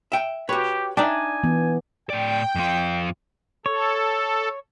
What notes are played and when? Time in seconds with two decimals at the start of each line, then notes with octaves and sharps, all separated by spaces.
0.12 E5 G5
0.49 F#4 G4 B4 C#5
0.97 D4 D#4 D5 E5 G5 G#5
1.44 E3 B3
2.10 A2 D5 G5
2.55 F2 F4
3.66 A4 C#5